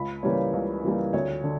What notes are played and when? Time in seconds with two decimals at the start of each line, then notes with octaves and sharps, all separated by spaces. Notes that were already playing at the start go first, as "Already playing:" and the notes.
Already playing: C#2 B5
0.23 C#3 E3 G3 A#3 C#5
0.53 C#2
0.84 C#3 E3 G3 A#3
1.13 D2 C#5
1.44 D3